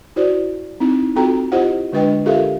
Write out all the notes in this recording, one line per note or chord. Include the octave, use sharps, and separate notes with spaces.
E4 F#4 C5 D5
C4 D#4 E4
C4 F4 F#4 A4 G5 A#5
E4 F4 G4 C5 D#5 F#5
D3 G#3 D4 B4 D#5 G5
F4 G4 A4 A#4 E5 F5